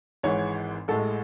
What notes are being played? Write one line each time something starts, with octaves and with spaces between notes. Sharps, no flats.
G#1 G#2 E3 G#3 C#5
A1 A2 G#3 A4